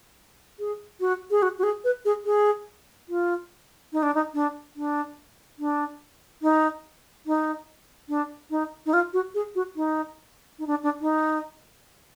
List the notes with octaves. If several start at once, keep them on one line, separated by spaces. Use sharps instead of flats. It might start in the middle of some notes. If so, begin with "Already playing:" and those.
G#4
F#4
G#4
F#4
F#4
G#4
B4
G#4
G#4
F4
D#4
D4
D#4
D4
D4
D4
D#4
D#4
D4
D#4
D#4
F4
F#4
G#4
F#4
D#4
D#4
D4
D4
D#4